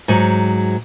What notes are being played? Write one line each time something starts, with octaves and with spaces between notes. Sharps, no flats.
G#2 F#3